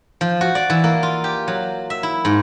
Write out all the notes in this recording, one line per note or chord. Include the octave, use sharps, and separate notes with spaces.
F3
F#4
D5
E3
A#3
F4
G4
F#3
E5
E4
G#2